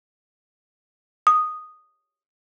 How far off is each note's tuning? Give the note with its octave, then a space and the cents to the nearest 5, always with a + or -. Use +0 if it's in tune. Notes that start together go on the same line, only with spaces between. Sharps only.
D#6 -5